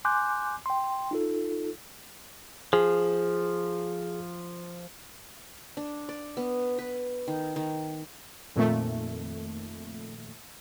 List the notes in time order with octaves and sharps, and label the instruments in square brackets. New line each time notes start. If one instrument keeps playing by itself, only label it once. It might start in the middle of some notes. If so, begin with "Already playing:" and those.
[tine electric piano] G#5 C6 D6 F#6 G6
G5 C6
D#4 F4 A4
[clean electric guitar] F3 [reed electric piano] G#4
[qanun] D4
D5
B3
B4
D#3
D#3
[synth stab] F2 A#2 D#3 A3